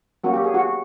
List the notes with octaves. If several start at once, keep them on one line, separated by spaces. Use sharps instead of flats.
F#3 A#3 C#4 F#4
G4
G#4
F#4